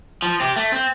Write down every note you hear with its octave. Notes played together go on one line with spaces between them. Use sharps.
F3
C4 G4
A3
C4